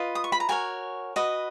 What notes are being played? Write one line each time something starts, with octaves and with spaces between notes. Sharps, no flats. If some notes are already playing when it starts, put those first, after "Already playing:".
Already playing: F4 B4 D#5
D#6
C#6
B5
A#5
F#4 A#4 C#5 G#5
F#4 B4 D#5